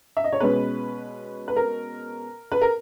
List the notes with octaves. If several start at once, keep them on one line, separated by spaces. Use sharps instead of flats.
E5
D#5
C#5
B2 G#3 C#4 B4
B4
A#4
B4
A#4